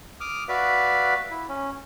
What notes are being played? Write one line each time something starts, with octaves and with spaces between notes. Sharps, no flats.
D6 D#6 F6
F#4 B4 D5 E5 F5
E4
C#4